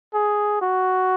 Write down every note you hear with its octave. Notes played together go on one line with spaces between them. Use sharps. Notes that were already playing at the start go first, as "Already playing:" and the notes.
G#4
F#4